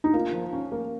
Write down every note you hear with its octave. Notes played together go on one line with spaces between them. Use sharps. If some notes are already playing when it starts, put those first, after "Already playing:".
D#4
A#3 F4
F3
C#4
A#3